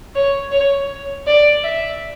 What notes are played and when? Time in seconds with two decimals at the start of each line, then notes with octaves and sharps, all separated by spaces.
0.15 C#5
0.52 C#5
1.27 D5
1.63 E5